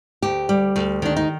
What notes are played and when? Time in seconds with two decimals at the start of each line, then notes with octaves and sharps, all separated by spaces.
0.22 D2 G4
0.49 G3
0.76 D2
1.02 D#3 D4
1.16 D#4